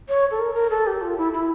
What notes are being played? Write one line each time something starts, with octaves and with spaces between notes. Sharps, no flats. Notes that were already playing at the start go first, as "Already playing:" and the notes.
C#5
A4
A#4
A#4
A4
G4
F4
E4
E4